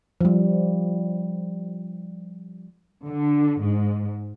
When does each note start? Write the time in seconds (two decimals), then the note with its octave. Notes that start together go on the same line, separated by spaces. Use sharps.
0.21 F3 G3
3.07 D3
3.61 G#2